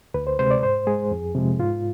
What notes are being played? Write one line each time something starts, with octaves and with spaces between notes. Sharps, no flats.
D2 B4
C5
C3 G#3 C5
D5
G#2 C5
G#3 G#4
F2
C3 F3 G#3
G#2 F4